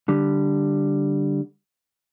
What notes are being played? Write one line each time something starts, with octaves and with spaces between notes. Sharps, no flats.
D3 G3